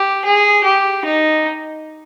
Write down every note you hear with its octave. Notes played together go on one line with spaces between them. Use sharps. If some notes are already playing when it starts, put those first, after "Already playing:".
Already playing: G4
G#4
G4
D#4